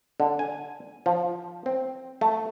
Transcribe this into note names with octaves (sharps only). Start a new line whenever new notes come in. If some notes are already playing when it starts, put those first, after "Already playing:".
D3
G#5
F3
C4
A3